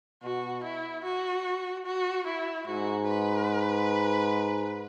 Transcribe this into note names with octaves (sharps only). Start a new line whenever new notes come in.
B2 F#4
E4
F#4
F#4
E4
G#2 F#4
B4